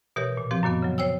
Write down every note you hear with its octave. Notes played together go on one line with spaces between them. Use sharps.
B2 E3 G4 A#4 C#5
A#2
F3 C4 G4
F#2 A#2 D#3 B3
C#3 F#3
C5 C#5 G5 E6